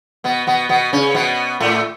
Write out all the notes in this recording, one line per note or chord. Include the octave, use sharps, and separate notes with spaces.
B2 B3
B2 B3
B2 B3
C#3 C#4
B2 B3
A2 A3